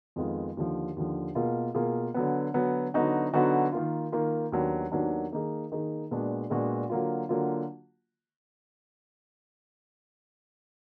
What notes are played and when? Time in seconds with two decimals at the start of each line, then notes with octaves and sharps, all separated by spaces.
0.16 F2 D#3 G#3 B3 F4
0.57 D#2 D3 F3
0.96 D#2 D3 F3
1.35 B2 A#3 F4 G#4
1.75 B2 A#3 F4 G#4
2.14 D3 F#3 B3
2.54 D3 F#3 B3
2.94 D3 F#3 B3 D#4 F#4
3.34 D3 F#3 B3 D#4 F#4
3.73 D#3 A#3 F4
4.12 D#3 A#3 F4
4.52 D#2 D#3 F#3 B3 D4
4.92 D#2 D#3 F#3 B3 D4
5.32 D#3 A#3 D#4 G#4
5.71 D#3 A#3 D#4 G#4
6.11 A#2 G#3 B3 D4 F#4
6.50 A#2 G#3 B3 D4 F#4
6.89 D3 F#3 A#3 F4
7.29 D3 F#3 A#3 F4